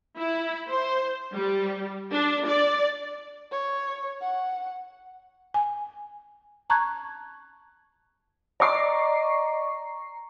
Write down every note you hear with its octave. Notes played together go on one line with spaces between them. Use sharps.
E4
C5
G3
D4
D5
C#5
F#5
G#5
A5 A#5 C#6 F#6 G#6
D5 D#5 A#5 C#6 D6 C7